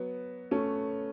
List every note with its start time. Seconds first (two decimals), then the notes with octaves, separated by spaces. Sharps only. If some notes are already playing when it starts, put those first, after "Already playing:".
Already playing: F#3 B3
0.51 A3 C#4